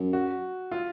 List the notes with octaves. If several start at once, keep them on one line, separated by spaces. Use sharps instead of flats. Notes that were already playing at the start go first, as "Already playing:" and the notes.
Already playing: F#2
F#4
F4